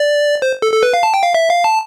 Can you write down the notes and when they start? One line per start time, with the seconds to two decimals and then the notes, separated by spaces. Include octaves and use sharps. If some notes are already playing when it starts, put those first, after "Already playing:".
Already playing: D5
0.42 C5
0.62 A4
0.73 A4
0.83 B4
0.94 F5
1.03 A5
1.14 G5
1.23 F5
1.34 E5
1.49 F5
1.64 A5